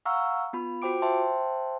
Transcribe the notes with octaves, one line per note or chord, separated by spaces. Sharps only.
F5 F#5 A#5 C#6 E6 F6
B3 F4 B5
F4 F#4 C5 G5 D6 D7
C5 E5 G5 A5 C6